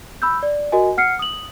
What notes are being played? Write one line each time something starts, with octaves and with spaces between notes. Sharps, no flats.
B5 E6 G6
D5
F#4 A#4 D#5 G#5
F#5 F6 C7 C#7
D#6 F#7